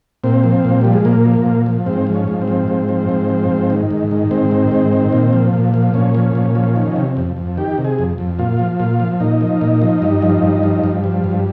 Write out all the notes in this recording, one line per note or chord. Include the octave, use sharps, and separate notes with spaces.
A#2 C4
F3
A#2
F3 G3
G#3
A#2 A#3
F3
A#2
F3
G#2 C4
F3
C#4
G#2
C4
F3
G#2
F3
G#2
F3
G#2
D#3
G#2
D#3
G#2 C4
D#3
G#2
D#3
A#2
F3
A#2
F3
A#2 C#4
F3
A#2
F3
D#3
C3
F2
F2
D#3 G4
C3
G#4
F2
F2
A#2 F4
F3
A#2 F4
F3
A#2 D#4
F3
A#2
F3
G2
F3
G2
F3
G2
F3
G2